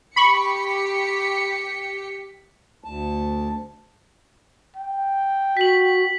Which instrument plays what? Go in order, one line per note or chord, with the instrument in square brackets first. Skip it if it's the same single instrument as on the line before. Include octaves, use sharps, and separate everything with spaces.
[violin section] G4 B6 C#7 [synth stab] B5 C#6
[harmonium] D2 A5
[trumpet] G5
[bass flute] F#4 [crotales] B6 F#7